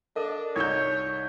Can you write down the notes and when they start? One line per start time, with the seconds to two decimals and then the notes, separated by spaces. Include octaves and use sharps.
0.16 D4 A4 A#4 D#5 F5
0.56 C2 D#4 C#5 D#5 C#6 E6 G6 G#6